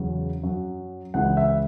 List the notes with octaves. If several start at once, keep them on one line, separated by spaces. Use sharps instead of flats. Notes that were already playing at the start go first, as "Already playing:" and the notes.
Already playing: E2 C#3 F#3
F#2 F#3
C#2 C#3 E3 F#5
E5